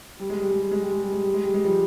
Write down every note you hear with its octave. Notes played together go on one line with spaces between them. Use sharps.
G3
G#3
G3
G#3
G3
G#3
G3
G#3
G3
G#3
G3
G#3
G3
G#3
F3 G3